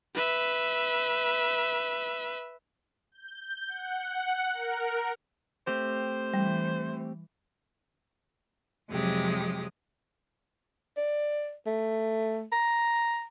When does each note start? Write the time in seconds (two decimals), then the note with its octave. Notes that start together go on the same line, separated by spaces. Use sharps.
0.16 B4 E5
3.12 G6
3.68 F#5
4.53 A#4
5.67 A3 C4 G4 C5
6.34 E3 G3
8.89 F2 C3 F#3 G#3 G4 D#6
10.97 D5
11.66 A3
12.52 A#5